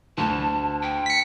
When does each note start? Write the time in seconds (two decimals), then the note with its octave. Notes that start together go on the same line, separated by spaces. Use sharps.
0.18 D2 A5
0.83 G5
1.06 B6 C#7